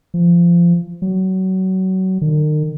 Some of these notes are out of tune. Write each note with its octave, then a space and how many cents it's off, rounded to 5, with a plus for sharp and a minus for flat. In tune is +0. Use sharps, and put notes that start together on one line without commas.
F3 -20
F#3 +25
D#3 -40